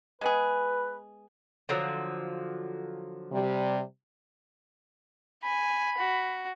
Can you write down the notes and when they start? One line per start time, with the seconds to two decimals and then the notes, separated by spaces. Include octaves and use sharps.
0.21 G#3 B3 G#4 B4
1.69 D3 F3 F#3
3.32 C3 G3
5.44 G#5 B5
5.98 F#4